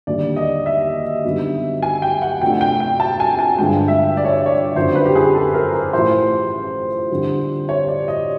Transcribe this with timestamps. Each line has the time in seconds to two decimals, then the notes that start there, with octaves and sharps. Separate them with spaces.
0.07 D#2 D3 G3 D5
0.36 D#5
0.66 E5
1.24 F#2 D3 G3 B3 D#4
1.83 G#5
2.02 G5
2.22 F#5
2.41 F2 C3 F3 A3 D4 G5
2.61 G5
2.80 G5
3.00 A5
3.20 G#5
3.39 G#5
3.58 G2 D3 F3 G#3 G5
3.88 E5
4.17 D5
4.25 C#5
4.32 D5
4.46 C#5
4.75 F#1 F2 D3 F#3 C5
4.95 B4
5.06 G4
5.16 G#4
5.34 A4
5.54 A#4
5.74 A#4
5.93 A1 A2 F3 A3 C5
7.10 F2 D3 G3
7.69 C#5
7.88 D5
8.08 D#5